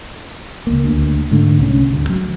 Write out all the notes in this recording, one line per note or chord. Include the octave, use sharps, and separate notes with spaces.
C#2 A#3
D2
G#2 D3 A3
C2 C#4
D2
F#3